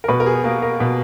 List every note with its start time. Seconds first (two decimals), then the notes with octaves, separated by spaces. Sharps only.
0.04 A#4
0.08 B2 B4
0.20 A#4
0.26 G#4
0.44 A#3 A#4
0.62 A#4
0.80 B2